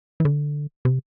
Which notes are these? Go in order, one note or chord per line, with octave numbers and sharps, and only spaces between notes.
E3
D3
C3